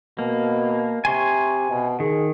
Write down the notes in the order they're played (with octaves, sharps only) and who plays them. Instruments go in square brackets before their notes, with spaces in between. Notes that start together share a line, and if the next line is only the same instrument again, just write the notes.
[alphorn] B2 [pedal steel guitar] A#3
[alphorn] C3 [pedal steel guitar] G#5 C6 C#6
[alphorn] B2
[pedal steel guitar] D#3 [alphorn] G#4